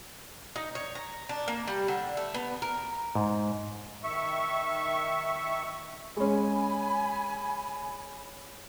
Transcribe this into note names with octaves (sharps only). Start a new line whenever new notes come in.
D#4
C#5
A#5
D4
A#3
G3
D3
A3
B3
A#4
G#2
D#3 E5 C#6
G#3 C#4 G#5 B5